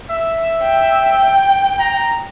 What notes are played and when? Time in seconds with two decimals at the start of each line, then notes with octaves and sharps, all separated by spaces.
0.11 E5
0.63 G5
1.79 A#5